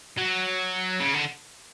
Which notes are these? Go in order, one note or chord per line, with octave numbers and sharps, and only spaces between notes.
F#3
C#3
D3